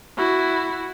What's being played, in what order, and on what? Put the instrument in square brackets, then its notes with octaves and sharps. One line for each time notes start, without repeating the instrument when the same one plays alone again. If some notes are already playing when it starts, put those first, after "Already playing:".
[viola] E4 F#4